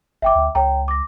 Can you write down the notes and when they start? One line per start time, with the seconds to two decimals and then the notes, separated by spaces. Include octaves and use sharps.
0.22 G1 E5 G5 D6
0.35 D2
0.55 C#2 C#5 G5 A#5
0.88 D6 A#6